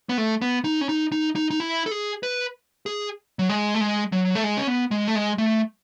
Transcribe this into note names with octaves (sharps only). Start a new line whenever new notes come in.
B3
A3
B3
D#4
C#4
D#4
D#4
D#4
D#4
E4
A4
G#4
B4
G#4
F#3
G#3
A3
G#3
F#3
A3
G#3
C#4
B3
G#3
A3
G#3
A3